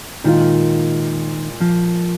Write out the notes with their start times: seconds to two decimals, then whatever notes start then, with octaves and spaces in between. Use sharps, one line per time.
0.24 A#2 D#3 G#3 F4
1.61 F3